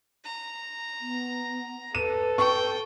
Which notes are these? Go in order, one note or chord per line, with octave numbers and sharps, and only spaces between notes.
A#5
B3
A4 B4 D#7
G5 C#6